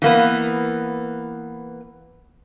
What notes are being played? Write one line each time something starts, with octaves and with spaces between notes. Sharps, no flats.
E3 A#3 B3